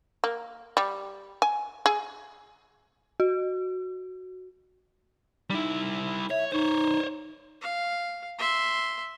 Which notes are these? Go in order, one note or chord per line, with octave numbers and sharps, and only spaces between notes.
A#3
G3
G#5
G#4
F#4
G3 D#4 E4
C#5 E5
D#4 C5 C#5
F5
E5 C6